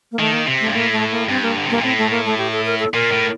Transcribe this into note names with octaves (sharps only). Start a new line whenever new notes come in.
A#3
D#3 A3
A#3
C3
A3
G2
A2 A#3
A3
A#3
G2 C4
A#3
D3
C3
A#2 A#3
A2 C4
A3
A#3
A3
G4
A4
A#4
A4
A#2 A#4
A2